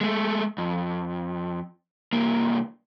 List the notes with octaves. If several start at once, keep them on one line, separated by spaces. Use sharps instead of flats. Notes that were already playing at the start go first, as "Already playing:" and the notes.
G#3 A3
F2
C2 A#3